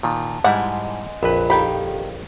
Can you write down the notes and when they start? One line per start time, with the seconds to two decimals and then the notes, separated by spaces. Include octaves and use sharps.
0.03 A#2 D#3 A5
0.44 G#2 G3 G#3 E4 F#5
1.23 A#1 F2 F4 A#4 B4 B5
1.50 D#3 G4 A4 F5 G5 B5